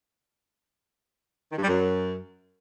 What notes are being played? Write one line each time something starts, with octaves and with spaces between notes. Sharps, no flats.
D#3
G2
G3
F#2